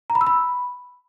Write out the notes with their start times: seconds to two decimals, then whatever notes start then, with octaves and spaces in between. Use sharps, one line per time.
0.10 A#5
0.15 B5
0.21 E6
0.27 B5